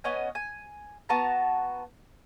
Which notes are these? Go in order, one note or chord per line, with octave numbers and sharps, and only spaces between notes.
B3 C#4 D#5 G#5
G#5
B3 F#4 A5 A#5